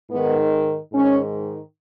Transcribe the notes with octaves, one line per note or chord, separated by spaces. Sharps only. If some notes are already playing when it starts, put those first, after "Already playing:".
G#2 D#3 B3
G#2 D#3 C#4